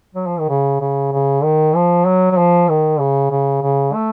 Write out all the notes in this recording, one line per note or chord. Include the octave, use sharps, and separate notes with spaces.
F#3
F3
D#3
C#3
C#3
C#3
D#3
F3
F#3
F#3
F3
D#3
C#3
C#3
C#3
A3